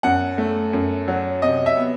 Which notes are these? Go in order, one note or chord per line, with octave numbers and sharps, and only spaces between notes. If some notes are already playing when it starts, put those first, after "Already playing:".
F#2 F#5
A3
F#2
F#3
C3 D#5
E5
B3